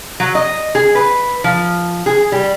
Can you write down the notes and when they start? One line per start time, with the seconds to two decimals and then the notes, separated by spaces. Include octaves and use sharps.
0.20 F#3
0.35 D#5
0.75 G#4
0.95 B4
1.44 F3
2.06 G#4
2.32 G3